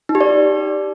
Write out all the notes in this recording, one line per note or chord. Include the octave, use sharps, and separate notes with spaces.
D#4
G4
D5